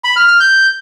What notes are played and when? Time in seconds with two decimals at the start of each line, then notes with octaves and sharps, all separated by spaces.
0.04 B5
0.16 F6
0.28 F6
0.40 G6